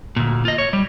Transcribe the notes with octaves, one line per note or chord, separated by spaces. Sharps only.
D2 A#2
F4 D#5
C#5
G3